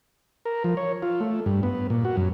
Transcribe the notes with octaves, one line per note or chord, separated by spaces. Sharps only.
A#4
F3
C#5
F4
A3
G2
B3
A#2
F#4
F#2